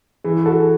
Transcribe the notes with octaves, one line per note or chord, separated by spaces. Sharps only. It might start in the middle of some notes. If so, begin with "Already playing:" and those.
E3 G#4
F#4 A4